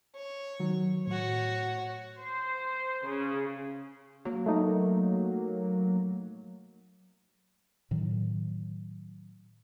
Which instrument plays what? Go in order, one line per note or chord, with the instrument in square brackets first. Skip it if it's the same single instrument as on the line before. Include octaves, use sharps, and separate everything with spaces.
[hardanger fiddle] C#5
[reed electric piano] D#3 F#3
[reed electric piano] A2 [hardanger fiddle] F#4 C#5
[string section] C5
C#3
[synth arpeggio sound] F#3 A#3
[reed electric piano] A3 D#4
[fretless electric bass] A2 D#3 F#3